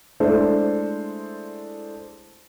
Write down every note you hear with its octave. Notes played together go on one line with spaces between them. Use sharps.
G#3 A3 D4 E4 A4 C5